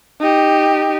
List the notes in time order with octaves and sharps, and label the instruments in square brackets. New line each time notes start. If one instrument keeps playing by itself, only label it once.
[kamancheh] D#4 G4